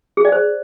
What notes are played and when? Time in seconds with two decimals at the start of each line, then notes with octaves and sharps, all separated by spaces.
0.17 G#4
0.25 D5
0.32 C5